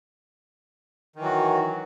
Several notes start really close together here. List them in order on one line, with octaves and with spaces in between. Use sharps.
D#3 E3 F#3 F#4